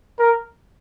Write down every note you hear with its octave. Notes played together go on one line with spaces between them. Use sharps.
A#4